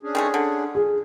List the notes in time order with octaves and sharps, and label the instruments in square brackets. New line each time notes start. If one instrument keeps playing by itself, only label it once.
[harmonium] C#4 D4 G#4
[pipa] D#3 G#3 A3
D3
[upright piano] G#4